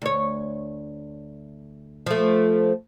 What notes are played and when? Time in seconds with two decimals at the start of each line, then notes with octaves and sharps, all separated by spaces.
0.02 D2 C#5
2.06 F3 A3